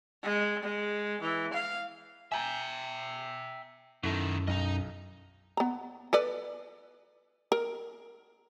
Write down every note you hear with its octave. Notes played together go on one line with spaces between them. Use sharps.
G#3
G#3
E3
F5
E5 G5 G#5 A#5
F#2 B2 D#3 E4 A4
B1 D#4 D#5
B3 A#5
A4 B4 D5
A#4